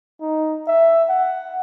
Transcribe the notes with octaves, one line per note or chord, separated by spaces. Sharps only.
D#4
E5
F#5